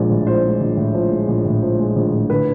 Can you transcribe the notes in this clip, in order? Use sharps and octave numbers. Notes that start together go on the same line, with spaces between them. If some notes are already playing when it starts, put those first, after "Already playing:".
Already playing: A#1 F3 G#3 D5
A2
F3 C5
G#3
A#1
A2
F3
G#3
A#1
A2
F3
G#3
A#1
A2
D3 B4